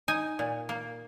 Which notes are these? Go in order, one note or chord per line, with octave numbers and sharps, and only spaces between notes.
D#4 G#5
A#2
A#3